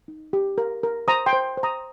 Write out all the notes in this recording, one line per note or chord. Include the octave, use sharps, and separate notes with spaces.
D#4
G4
A#4
A#4
C5 A#5 D#6
G5 C6
C5
C5
A#5 D#6